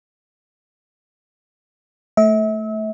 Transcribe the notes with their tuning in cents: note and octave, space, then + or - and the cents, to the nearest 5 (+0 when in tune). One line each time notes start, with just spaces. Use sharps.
A3 +0 E5 -35